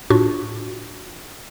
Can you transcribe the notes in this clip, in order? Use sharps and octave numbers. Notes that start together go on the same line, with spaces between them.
A2 D4 F4 F#4 C#6